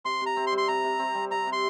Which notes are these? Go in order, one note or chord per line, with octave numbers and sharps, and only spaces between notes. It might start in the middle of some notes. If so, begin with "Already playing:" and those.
C3 C6
C3 A#5
C4
C6
G3
C6
C3 A#5
C3
C4
G3
C3 A#5
C3
C6